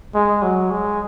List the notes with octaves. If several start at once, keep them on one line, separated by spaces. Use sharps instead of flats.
G#3
F#3
G#3